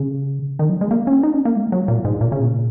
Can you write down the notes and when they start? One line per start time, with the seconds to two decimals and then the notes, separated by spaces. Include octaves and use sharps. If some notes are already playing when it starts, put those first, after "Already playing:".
Already playing: C#3
0.59 D#3
0.69 F#3
0.81 G#3
0.91 A#3
1.07 C#4
1.23 D#4
1.34 C#4
1.45 A#3
1.56 G#3
1.72 F#3
1.88 A#2
2.05 G#2
2.21 A#2
2.32 C#3
2.42 A#2